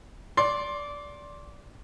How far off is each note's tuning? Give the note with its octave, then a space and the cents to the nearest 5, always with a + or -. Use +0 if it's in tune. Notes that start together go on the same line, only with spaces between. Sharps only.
D5 -15 C6 +20